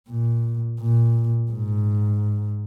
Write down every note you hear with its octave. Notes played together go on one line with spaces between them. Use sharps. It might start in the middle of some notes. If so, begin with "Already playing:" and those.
A#2
A#2
G#2